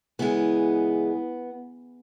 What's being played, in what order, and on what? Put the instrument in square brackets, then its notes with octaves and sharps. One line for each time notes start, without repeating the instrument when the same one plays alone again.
[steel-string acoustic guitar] C#3 E3 G#3 B3